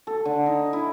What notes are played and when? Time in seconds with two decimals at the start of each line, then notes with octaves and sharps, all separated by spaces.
0.07 A4
0.25 D3
0.46 D#4
0.59 D#4
0.73 E4